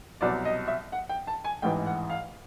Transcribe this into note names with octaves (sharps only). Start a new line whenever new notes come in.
C2 B2 F#3 D5
D#5
E5
F#5
G5
A5
G#5
A1 G#2 E3 G5
F#5
F5